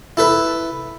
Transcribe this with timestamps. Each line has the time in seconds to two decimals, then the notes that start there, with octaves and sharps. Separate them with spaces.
0.17 E4 A4 B4